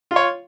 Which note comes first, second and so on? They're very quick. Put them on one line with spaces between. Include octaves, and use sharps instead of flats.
F4 F5 C#5